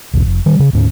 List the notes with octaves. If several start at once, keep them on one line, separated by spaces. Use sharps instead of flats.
B1 E2 B2
F1
D#3 G3
C#3
D2 G#2 C#4